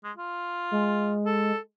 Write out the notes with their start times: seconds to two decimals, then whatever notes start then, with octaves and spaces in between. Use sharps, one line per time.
0.04 G#3
0.17 F4
0.71 G#3
1.26 A4